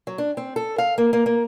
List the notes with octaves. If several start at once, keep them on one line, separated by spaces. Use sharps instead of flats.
F#3
D4
C4
A4
F5
A#3
A#3
A#3